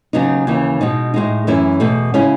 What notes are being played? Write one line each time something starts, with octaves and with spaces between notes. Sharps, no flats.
D#2 C#3 F#3 B3 D#4
D#2 C#3 E3
B2 G#3 D#4
A2 G#3 D#4
F#2 E3 A3 C#4 E4
E2 B2 A3
C#3 G#3 C#4 E4